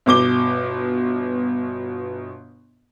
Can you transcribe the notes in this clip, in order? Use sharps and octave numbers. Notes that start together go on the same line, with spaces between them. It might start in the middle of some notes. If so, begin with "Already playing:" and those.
G1 B2 D6 G7